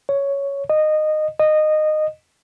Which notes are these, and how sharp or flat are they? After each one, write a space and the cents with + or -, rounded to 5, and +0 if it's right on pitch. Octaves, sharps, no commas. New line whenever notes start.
C#5 +5
D#5 -15
D#5 -15